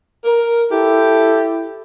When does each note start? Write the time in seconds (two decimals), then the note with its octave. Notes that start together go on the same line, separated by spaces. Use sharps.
0.24 A#4
0.71 E4 G4 A4